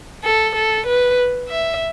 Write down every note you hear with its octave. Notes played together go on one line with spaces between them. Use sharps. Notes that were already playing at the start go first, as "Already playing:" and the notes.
A4
A4
B4
E5